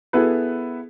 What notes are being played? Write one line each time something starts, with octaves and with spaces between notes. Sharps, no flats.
B3 E4 G#4 A4 B4